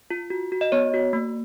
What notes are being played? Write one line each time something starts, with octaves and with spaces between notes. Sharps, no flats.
F4
F#4
F#4
D#5
B3 C#5
F#4
A#3